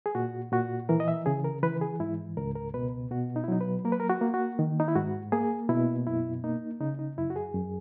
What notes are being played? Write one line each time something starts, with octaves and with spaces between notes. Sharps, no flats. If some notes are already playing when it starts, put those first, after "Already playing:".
G#4
A#2 F#4
A#2 F#4
E3 A#4
D#5
E5
C#3 G#4
A#4
E3 B4
G#4
G#2 E4
C#2 A#4
A#4
B2 B4
B2 F#4
D#4
E4
F#3 D#4
B4
A#3 A#4
B4
A#4
F#4
A#3
F#4
D#3
D#4
E4
G#2 F#4
A#3 G#4
B2 E4
F#2 E4
A#3 D#4
C#3 D#4
D#4
F#2 E4
F#4
G#4
F#2